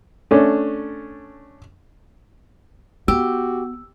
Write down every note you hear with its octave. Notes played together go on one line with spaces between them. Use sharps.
A3 C#4 D4
B3 F#4 G4 E6